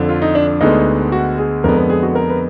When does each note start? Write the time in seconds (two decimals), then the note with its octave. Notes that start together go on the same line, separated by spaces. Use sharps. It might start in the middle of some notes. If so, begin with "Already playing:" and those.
Already playing: F2 D3 F3
0.09 F4
0.22 D#4
0.35 D4
0.48 D4
0.61 D2 D3 G#3 B3 D#4
1.12 F#4
1.38 G#4
1.64 F2 D3 G#3 B3 A#4
1.77 B4
1.90 G#4
2.03 F#4
2.15 A#4
2.30 B4